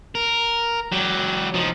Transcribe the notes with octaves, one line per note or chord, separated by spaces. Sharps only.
A#4
F#3 G4
F3 D#4